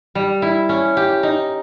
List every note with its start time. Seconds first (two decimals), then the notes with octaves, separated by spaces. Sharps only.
0.15 G3
0.42 E4
0.69 C#4
0.97 G4
1.23 D#4